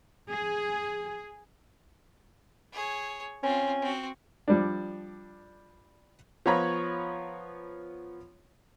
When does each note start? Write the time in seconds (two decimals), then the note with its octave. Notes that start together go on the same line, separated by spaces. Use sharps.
0.28 G#4
2.73 G#4 C#5
3.43 C4 C#4 F4
3.82 C4 F#4
4.48 F3 G3 D4
6.46 F3 B3 F4 C#5 A#5 B5